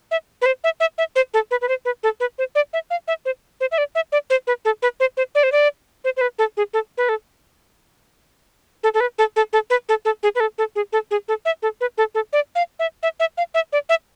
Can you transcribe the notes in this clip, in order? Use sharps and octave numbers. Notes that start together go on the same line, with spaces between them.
E5
B4
C5
E5
E5
E5
C5
A4
B4
B4
C5
B4
A4
B4
C5
D5
E5
F5
E5
C5
C5
E5
D5
E5
D5
C5
B4
A4
B4
C5
C5
D5
C5
D5
C5
C5
B4
A4
G#4
A4
B4
A4
A4
A4
B4
A4
A4
A4
B4
A4
A4
G#4
B4
A4
A4
G#4
A4
G#4
A4
E5
A4
B4
A4
A4
D5
F5
E5
E5
E5
F5
E5
D5
E5